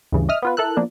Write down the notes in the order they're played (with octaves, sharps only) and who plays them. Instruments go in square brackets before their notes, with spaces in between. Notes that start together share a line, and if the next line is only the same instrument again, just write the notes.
[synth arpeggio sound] D2 G2 C#3 E3
D#5 E5 D#6 F6
B3 F4 B4
E4 A4 A#4 E6 F#6
F3 A#3 B3 D4